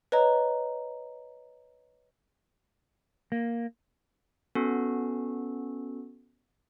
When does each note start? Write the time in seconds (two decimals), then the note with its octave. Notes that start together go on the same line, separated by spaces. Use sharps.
0.12 B4 C#5 D#5 A#5
3.32 A#3
4.55 B3 C#4 F#4 A4